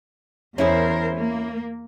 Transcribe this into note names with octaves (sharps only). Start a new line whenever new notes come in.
E2 C#4 E4 G#4 A#4 C5
A#3